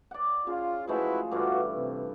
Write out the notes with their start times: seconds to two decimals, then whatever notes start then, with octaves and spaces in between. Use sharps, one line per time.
0.11 D5 F#5
0.47 C#3 F4
0.87 F3 G#3 A3 E4 F#4 B4
1.31 G2 D3 E3 F4 F#4
1.75 C3